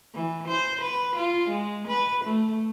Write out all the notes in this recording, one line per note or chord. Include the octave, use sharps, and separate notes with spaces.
E3
C5
B4
F4
G#3
B4
A3